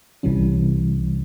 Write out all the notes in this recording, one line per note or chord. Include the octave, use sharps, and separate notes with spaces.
C2 C3 E3 G3 C#4